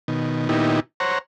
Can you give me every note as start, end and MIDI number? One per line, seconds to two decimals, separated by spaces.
0.08 0.48 47
0.08 0.48 51
0.49 0.80 46
0.49 0.80 51
0.49 0.80 59
0.49 0.80 63
0.49 0.80 64
0.49 0.80 67
1.00 1.18 72
1.00 1.18 73
1.00 1.18 78
1.00 1.18 82